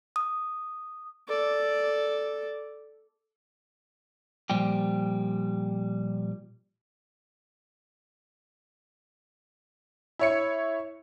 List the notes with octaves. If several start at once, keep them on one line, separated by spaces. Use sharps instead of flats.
D#6
A4 D5
A#2 F3 G3 G4
E4 C#5 C#7